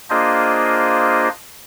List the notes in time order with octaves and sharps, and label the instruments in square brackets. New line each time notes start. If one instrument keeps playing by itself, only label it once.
[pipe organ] A#3 D4 F4 G#4 C5 D#5